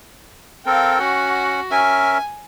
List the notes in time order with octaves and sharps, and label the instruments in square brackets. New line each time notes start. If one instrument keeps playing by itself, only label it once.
[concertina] C4 A4 A#4 [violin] F5 G5
[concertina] C#4 F#5 [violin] F#4
[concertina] C#4 A#4 E5 [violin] G#5